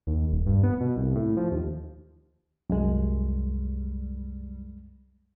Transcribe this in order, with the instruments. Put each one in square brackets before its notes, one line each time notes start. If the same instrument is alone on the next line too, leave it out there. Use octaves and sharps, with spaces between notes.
[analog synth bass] D#2
D#1
G2
B3
B2
C2
A2
F3
D#2
[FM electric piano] C2 G3 [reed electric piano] F#2 G#3